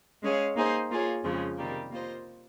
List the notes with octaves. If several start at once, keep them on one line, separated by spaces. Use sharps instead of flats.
G#3 C#4 G#4 C#5 F5
A#3 D#4 G#4 C5
A#3 F4 G#4 C#5
F2 C#3 F3 G#3
C3 D#3 G3 A#3
A#3 F4 C5 D#5